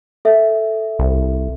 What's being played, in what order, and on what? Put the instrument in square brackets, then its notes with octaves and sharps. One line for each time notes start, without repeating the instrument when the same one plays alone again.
[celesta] A4 E5
[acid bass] C2